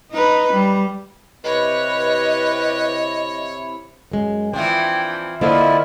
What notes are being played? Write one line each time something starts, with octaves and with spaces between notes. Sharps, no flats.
D#4 B4
G3
C3 E4 G4 B4 C#5 D#5
F#2 G#3
E3 F3 C4 D4 G5
D3 F3 A#3 E4 C5 D5 D#5